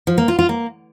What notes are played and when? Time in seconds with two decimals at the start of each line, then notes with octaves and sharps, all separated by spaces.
0.07 F3
0.18 A#3
0.28 F4
0.39 F4
0.49 A#3